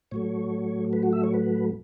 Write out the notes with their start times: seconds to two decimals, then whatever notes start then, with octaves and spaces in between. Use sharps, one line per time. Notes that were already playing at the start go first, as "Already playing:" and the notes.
0.11 A2 F#3 A3 C#5
0.93 B4
1.03 F#4
1.13 E5
1.23 C#5
1.34 B4